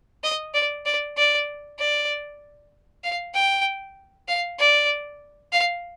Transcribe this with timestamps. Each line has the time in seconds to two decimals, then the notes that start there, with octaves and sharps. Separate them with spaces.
0.24 D#5
0.54 D5
0.86 D5
1.17 D5
1.79 D5
3.04 F5
3.34 G5
4.28 F5
4.59 D5
5.52 F5